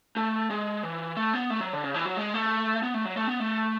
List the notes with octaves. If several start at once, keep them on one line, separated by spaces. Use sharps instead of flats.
A3
G#3
E3
A3
B3
A3
F#3
D3
C#3
E3
F#3
G#3
A3
B3
A3
F#3
A3
B3
A3